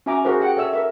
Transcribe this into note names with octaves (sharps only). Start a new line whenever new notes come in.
C#4 F#4 E5 G#5 A#5 D6
F#4 G#4 A#4 C5
G4 G#4 F#5 G5
A4 C#5 E5 E6
A#4 E5